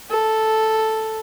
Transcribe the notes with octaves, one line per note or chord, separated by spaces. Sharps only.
A4